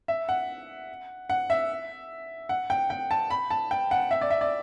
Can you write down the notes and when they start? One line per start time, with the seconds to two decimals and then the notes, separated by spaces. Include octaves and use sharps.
0.08 E5
0.29 F#5
1.30 F#5
1.50 E5
2.49 F#5
2.70 G5
2.90 G5
3.11 A5
3.30 B5
3.51 A5
3.71 G5
3.91 F#5
4.11 E5
4.21 D5
4.30 E5
4.41 D5